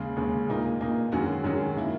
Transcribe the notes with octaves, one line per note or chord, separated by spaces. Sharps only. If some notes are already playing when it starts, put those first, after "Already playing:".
Already playing: D#2 C#3 G#3
D#2 C#3 G#3
A#2 A#3 D#4
A#2 A#3 D#4
F#2 D#3 G#3 C#4 F#4
F#2 D#3 G#3 C#4 F#4
D#3 A#3 E4